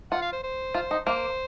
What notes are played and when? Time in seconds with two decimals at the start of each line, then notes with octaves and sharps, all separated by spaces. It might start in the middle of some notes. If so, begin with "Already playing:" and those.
0.12 F4 F#5
0.22 F5
0.33 C5
0.44 C5
0.74 F4
0.91 D#4
1.06 A#3 C5